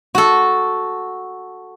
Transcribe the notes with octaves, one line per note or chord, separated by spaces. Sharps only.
F#4 A4